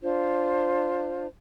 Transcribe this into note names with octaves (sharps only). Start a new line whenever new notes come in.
D4 F4 C5